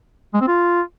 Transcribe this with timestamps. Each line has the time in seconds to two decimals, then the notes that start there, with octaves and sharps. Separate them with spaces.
0.34 G#3
0.41 C4
0.48 F4